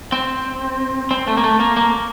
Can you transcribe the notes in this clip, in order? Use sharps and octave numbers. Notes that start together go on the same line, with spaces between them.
C4
C4
A3
A#3
A3
A#3
A#3